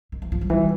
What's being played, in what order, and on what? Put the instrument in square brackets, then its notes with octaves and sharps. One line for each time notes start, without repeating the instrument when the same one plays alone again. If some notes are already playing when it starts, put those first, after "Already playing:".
[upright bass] D#3
E3
F3
F#3
[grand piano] E3 [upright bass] G3